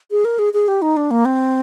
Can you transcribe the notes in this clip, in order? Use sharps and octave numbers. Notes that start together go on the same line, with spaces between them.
G#4
A#4
G#4
G#4
G4
D#4
D4
A#3
C4